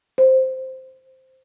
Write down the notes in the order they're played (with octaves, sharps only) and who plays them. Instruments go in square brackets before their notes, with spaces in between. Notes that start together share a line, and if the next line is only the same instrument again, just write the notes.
[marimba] C5